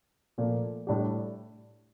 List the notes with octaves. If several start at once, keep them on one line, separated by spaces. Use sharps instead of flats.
A#2 F3 A3
A2 G3 D4 G4